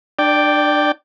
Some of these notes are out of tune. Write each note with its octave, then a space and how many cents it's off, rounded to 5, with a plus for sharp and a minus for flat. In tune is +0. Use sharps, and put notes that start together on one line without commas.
D4 +30 D5 +0 G5 +0